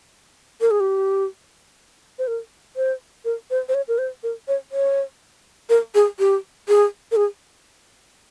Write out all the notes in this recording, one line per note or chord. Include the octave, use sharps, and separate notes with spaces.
A#4
G#4
G4
C5
A#4
C5
A#4
C5
C5
C#5
A#4
C5
A#4
C#5
C#5
A#4
G#4
G4
G#4
A#4
G#4